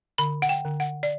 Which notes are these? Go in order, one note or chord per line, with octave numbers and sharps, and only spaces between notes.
D3 B5
F#5
G5
D3
F#5
D5